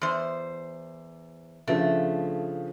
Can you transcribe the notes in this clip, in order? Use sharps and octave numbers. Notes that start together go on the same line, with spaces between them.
E2 C5
C#3 F3 A3 D4